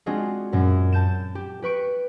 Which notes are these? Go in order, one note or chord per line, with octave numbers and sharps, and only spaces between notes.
G#3 C4 D4 F4 F#4 G#4
F#2 A#2
A5 G6 E7
G4
G4 B4 C#6 D7